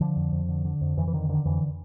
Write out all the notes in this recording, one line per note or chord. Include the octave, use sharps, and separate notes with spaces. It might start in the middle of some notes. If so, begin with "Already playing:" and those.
D3 F3
F2
F2
D3
D3
F2
F2 E3
E3
D3 D#3
D3 D#3
F2 E3